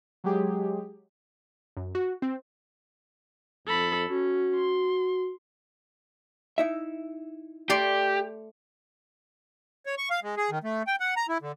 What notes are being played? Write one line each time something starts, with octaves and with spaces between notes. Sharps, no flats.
F#3 G#3 G4 G#4
F#2
F#4
C4
F2 A4 B5
C#4 F#4
C6
D#4 E4 E5
A3 G4 D5 C6
C#5
C#6
F5
G#3
G#4
D#3
A3
G5
F#5
A#5
E4
D3